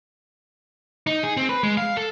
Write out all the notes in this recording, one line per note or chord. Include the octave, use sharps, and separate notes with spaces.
D#4
G#4
C4
B4
G#3
F5
A4